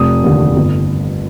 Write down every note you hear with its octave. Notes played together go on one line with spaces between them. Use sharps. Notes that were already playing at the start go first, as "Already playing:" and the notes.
Already playing: F1 D#6
D#2 D3
G1